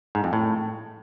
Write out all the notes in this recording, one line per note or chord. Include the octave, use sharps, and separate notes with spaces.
G#2
F2
A2